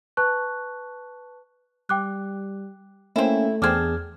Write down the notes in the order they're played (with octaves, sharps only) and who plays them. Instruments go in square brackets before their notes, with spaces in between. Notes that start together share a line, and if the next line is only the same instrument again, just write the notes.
[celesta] B4 A5 C#6 F#6
[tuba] G3 [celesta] G5 D6 F#6
[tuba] A3 [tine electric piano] A#3 C#4 [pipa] C4 E4
[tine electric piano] E2 G#4 [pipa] C4 D4 [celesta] D6 F6 G#6